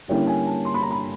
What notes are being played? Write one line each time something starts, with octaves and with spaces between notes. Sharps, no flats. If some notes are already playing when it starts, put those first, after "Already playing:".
D3 G3 A#3 C#4 E4 G5
G#5
A5
C6
B5
A#5
B5